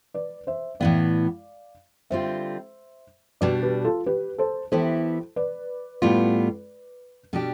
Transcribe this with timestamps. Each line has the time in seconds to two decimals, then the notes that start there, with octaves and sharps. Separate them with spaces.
0.14 B4 D5
0.47 C5 E5
0.80 A2 E3 B3 D5 F5
2.10 D3 G3 C4 F4 C5 E5
3.41 B2 G3 D4 B4 D5
3.63 G4 B4
3.84 F4 A4
4.06 G4 B4
4.38 A4 C5
4.72 E3 B3 E4 G4 A4 C5
5.36 B4 D5
6.02 A2 G3 B3 F4
7.33 B2 G3 D4 G4